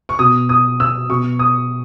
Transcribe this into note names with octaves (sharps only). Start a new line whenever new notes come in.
C#6
B2 D#6
D#6
E6
B2 C#6
D#6